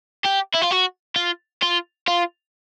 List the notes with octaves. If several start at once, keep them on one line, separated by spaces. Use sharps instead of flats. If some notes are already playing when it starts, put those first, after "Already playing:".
G4
E4
F4
F#4
F4
F4
F4